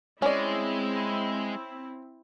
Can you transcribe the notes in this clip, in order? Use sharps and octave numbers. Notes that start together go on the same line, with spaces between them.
G#3 C4 C#4 E4 D5